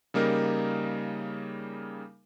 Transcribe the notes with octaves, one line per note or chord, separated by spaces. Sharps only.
C#3 G3 A#3 D#4 A#4